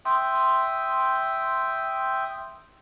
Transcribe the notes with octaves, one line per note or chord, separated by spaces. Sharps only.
E5 G5 C6 D#6